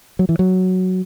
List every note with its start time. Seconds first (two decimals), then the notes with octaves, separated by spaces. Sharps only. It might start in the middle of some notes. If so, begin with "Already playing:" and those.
0.19 F#3
0.29 E3
0.39 F#3